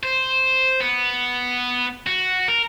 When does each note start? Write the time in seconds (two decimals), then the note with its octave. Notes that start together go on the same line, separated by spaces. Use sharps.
0.03 C5
0.80 B3
2.06 F#4
2.48 A#4